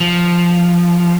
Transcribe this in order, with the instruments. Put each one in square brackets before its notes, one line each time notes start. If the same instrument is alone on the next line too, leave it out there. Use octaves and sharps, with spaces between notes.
[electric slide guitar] F3